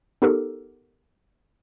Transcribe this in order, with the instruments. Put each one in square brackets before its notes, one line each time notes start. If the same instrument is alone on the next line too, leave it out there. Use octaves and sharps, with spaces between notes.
[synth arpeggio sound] B3 D#4 G4 A4 A#4